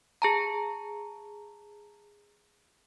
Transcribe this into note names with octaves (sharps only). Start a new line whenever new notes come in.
G#4 A5 A#5